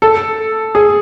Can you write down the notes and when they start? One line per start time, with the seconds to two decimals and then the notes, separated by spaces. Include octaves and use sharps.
0.02 A4
0.75 G#4